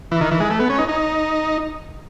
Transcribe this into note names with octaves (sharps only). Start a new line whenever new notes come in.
E3
D#3
E3
G#3
A3
B3
C#4
D#4
D#4